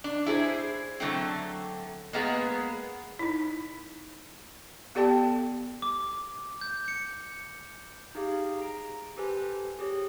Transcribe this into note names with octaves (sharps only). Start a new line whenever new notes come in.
D4
E4 G#4 A4 C5
D3 F#3 A3 C4
G#3 A#3 B3 G#4
D#4 E4
B3 G4 A4 D5 G5 A5
D6
G6
C#7
D#4 G4 G#4 F5
A#5 D7
G4 A4 B4 C5 G#5
G4 G#4 C#5